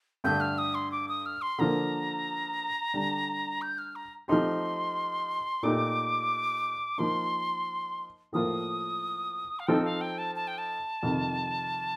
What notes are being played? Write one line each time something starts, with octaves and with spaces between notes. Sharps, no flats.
G2 D3 A3 D4 G6
F6
D#6
C6
D6
D#6
F6
C6
D3 F3 A#3 A#5
D3 G3 D4
G6
F6
A#5
F3 A3 C4 D#4 G4 C6
A#2 A3 D#4 G4 D6
F3 A#3 D#4 C6
A2 F3 A#3 F4 D#6
F5
F3 C4 D#4 A4 G5
F5
G5
A5
A5
G5
A5
F2 C3 D#3